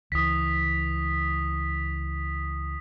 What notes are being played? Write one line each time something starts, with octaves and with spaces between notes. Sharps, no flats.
C#2 E3 D#6 B6